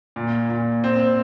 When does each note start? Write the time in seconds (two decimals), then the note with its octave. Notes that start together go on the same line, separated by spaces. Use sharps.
0.16 A#2
0.49 A#2
0.84 C4